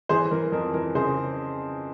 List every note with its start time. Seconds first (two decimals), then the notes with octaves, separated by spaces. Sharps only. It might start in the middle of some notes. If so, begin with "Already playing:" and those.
0.09 E3 G#4 C5
0.31 E3 A#4
0.52 F2 A#4
0.74 E3 A#4
0.95 C#3 G#4 C5